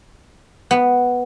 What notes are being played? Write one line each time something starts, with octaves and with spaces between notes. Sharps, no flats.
B3